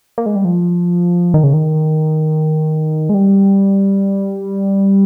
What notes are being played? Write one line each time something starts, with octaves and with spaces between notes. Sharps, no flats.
A#3
G#3
G3
F3
D#3
C#3
D#3
G#3
G3